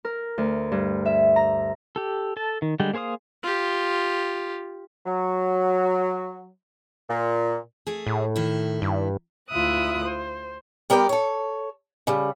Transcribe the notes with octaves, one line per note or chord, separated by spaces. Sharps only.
A#4
D2
G2
E5
A#5
G4 A4
A4 A5
D#3
D3 G3 G#3 G5
A#3 G#4 C5 F5 D#6
F4 G4
F#3
A#2
A3 G#4
A2
D#3 E4
G2
D2 E4 F4 E5 D#6 F#6
C5
G3 B3 A#4 D5 G5
A4 C#5
C#3 G3